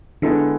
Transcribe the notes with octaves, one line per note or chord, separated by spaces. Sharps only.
D3 G#3 B3 E4 A4